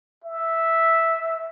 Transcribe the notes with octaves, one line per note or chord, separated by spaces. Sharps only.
E5